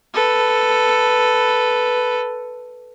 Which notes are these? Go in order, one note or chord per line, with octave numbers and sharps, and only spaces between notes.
A4 B4